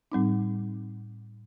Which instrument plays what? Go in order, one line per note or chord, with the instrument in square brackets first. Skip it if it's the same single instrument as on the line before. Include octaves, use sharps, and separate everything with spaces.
[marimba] A2 G3 C4 D#4